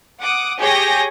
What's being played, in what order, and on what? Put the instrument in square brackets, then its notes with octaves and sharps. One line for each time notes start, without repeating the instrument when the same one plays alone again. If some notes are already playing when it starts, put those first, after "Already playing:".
[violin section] F#5 D6 D#6
G4 G#4 C#5 G#5 G6 A#6